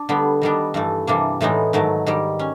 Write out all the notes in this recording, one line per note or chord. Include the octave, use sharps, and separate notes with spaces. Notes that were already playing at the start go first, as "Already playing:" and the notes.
Already playing: D4
D3 G3 B3
D#3 G3 B3 D4
G2 E3 A3
C3 E3 G3 A#3 D4
A2 E3 G#3 B3 D#4
G#2 D#3 F#3 A3
G#2 D#3 G3
C#4